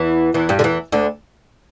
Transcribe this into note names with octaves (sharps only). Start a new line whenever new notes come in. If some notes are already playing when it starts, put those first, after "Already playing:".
Already playing: E2 E3
E2 E3
G2 G3
D3
E2 E3
D2 D3